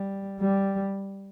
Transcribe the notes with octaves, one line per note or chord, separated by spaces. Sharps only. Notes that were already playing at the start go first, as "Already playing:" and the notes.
Already playing: G3
G3